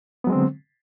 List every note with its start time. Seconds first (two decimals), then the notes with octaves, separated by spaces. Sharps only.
0.24 B3
0.27 F#3
0.30 G#3
0.32 C4
0.35 D3